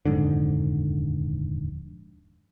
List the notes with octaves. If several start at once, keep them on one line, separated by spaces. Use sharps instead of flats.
D#1 F2 G#2 D3